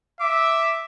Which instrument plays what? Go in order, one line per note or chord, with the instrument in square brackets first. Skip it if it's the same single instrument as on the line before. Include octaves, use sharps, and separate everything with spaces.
[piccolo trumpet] E5 [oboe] D6